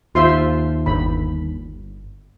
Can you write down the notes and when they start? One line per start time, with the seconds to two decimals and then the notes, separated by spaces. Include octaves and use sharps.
0.15 D#2 F4 C5 E5 C6
0.86 G1 B5